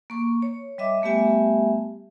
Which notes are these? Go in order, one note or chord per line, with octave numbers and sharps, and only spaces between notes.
A#3 C#6
C#5
G3 D#5 E5 D6
G3 A3 B3 G4 E5 G#5